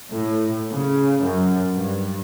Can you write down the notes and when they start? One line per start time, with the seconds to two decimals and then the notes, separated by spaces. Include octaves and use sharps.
0.12 A2
0.72 C#3
1.24 F#2
1.73 G2